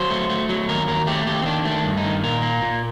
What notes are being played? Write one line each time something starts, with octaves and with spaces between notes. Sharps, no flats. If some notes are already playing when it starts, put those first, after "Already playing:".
Already playing: F#3 C5
A3
A3
F#3
D#2 A#4
D#2 A#4
A3 G4
D#2 G4
C4
D#3 D4
A3
D4
G2
D#4
D#3
A#2 A#4
A#3
A#2